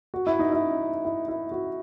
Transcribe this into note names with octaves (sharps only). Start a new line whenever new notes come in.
F#4
E4
D#4
E4
E4
E4
F#4